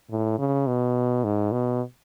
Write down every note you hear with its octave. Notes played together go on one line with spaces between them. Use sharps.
A2
C#3
B2
G#2
B2